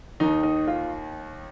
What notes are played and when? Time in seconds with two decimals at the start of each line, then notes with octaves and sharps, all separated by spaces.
0.20 D#2 D#3 D#4
0.43 D#4
0.67 F4